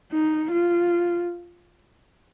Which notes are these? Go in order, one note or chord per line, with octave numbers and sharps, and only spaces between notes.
D#4
F4